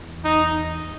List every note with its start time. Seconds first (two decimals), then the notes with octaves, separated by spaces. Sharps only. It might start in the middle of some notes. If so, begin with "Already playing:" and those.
Already playing: E2
0.24 D#4